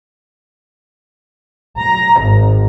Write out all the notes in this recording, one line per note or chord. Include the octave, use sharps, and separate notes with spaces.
A#5
G#1